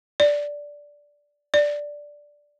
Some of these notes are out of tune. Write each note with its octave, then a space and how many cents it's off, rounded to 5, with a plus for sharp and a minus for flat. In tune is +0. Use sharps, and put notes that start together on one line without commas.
D5 -10
D5 -5